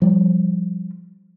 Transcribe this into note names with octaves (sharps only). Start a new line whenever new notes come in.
F3 G3